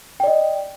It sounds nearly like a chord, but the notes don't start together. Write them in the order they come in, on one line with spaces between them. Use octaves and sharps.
G5 D5 D#5